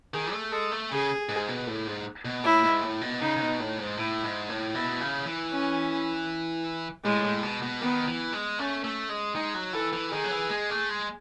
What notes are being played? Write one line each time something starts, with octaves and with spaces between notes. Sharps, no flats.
D#3 G#4
A3
G#3 A4
A3
C#3 G#4
G#2
B2
A2
G#2
B2
A2 E4
G#2
A2
B2
C#3 D#4
C#3
B2
A2
G#2
A2 E4
G#2
A2
B2 E4
C#3
E3
C#4
A2 G#3
A2
B2
B2
D#3 B3
E3
G#3
A3 C#4
A3
G#3
G#3 D#4
F#3
E3 A4
E3
D#3 G#4
F#3
E3
G#3
A3
G#3